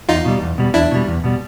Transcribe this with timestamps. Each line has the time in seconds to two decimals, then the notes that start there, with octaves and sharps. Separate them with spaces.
0.09 E2 D#4 F4
0.25 B2 G3
0.42 E2
0.58 B2 G3
0.74 E2 D4 E4
0.91 B2 G3
1.08 E2
1.24 B2 G3